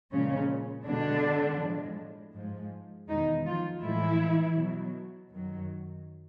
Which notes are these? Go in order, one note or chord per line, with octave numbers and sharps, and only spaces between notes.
A#2 C#3 F3 G#3 C#4
B2 D3 G#3 D4
A2 F3 G#3
G#2 F3 G#3
E2 B2 D#3 G#3 D#4
F3 F4
A2 E3 F3 G#3 E4
B2 F#3
F#2 D#3 F#3